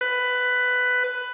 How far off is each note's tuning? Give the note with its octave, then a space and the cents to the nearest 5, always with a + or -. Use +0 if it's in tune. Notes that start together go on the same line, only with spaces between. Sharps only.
B4 +10